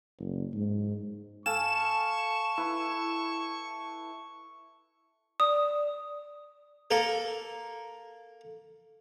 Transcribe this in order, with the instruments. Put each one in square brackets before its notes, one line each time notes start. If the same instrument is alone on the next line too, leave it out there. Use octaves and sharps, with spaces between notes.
[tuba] F#1
G#2
[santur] A4 F5 G#5 [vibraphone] A5 [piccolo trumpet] C#6 [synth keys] E7
[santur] E4 B4
[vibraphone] D5 [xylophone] D#6
[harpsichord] A#3 A4 A#4